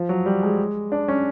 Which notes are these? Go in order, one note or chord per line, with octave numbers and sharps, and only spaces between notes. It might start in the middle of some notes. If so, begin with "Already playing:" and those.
Already playing: F3
F#3
G3
G#3
D4
C#4